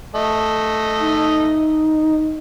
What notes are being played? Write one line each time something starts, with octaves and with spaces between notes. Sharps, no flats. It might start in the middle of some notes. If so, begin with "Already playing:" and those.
A3 D#5
D#4